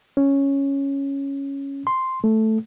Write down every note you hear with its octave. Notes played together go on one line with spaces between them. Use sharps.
C#4
C6
A3